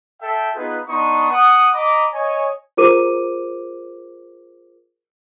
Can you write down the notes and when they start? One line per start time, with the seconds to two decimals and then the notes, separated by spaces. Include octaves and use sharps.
0.21 A4 E5 G5
0.55 B3 D#4 F4 G#4 B4
0.88 B3 D4 D#4 C6 C#6 D#6
1.30 F#5 D#6
1.73 D#5 A#5 B5 D6
2.13 C#5 D#5 G#5
2.77 F4 G#4 A#4 C5 D6 D#7